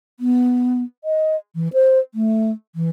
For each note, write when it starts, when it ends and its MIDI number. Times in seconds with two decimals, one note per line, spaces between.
0.20 0.83 59
1.04 1.36 75
1.55 1.68 52
1.73 1.99 72
2.15 2.51 57
2.75 2.89 52